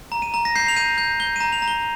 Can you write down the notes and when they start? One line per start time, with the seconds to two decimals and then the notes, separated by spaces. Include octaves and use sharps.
0.12 A#5
0.22 D#7
0.34 A#5
0.45 A#6
0.56 G6 C7
0.68 F7
0.76 G6 D#7
0.98 G6
1.20 G6 G7
1.36 D#7
1.40 A#5
1.52 F7
1.62 A#5
1.68 G7